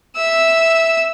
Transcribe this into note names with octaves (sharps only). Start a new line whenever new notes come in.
E5 E6